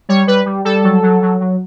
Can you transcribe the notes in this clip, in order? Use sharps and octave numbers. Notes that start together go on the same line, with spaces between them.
G3 C#5
G3 B4
G3
G3 A4
F#3
F#3
F#3
F#3